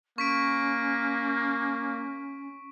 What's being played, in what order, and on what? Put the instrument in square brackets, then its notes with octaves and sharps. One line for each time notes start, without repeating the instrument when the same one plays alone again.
[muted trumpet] A#3 [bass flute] C#4 [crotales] C#6 B6 D7